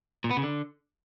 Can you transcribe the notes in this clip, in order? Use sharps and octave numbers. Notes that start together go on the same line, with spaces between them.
A#2
B3
C#3
D3